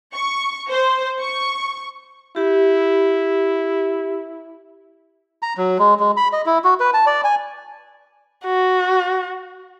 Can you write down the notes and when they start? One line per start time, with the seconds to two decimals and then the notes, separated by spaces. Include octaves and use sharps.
0.14 C#6
0.71 C5
1.21 C#6
2.36 E4 G4
5.42 A#5
5.57 F#3
5.79 G#3
6.00 G#3
6.17 B5
6.33 D#5
6.46 E4
6.64 F#4
6.80 B4
6.94 A5
7.06 D5
7.24 G#5
8.45 F#4